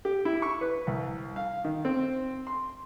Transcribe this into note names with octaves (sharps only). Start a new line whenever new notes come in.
G4
E4
C#6
B4
C2
F5
D#3
C4
C6